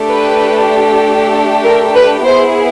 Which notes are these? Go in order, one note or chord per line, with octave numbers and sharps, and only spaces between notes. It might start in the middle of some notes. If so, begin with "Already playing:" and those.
Already playing: A3 D4 G4
B4
A#4
B4
B3 E4 G#4 C5